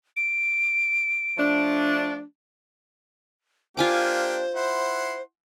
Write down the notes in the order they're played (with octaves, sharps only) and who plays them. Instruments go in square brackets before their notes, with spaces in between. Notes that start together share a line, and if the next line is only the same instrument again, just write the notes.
[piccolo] D7
[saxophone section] F3 A3 D4
[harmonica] A#3 D4 G4 [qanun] F4 G#5 D6 [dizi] C5
[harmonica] E4 F#5 C6